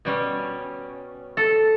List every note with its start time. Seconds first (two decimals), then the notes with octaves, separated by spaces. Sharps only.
0.05 B2 G3 C#4
1.37 A4